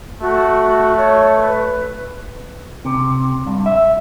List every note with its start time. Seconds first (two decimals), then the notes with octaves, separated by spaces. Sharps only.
0.21 A3 F#4
0.97 C#5
1.37 B4
2.85 C3
3.46 G2
3.66 E5